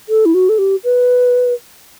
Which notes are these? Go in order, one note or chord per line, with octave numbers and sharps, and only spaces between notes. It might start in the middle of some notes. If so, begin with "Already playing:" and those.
A4
E4
F#4
A4
G4
B4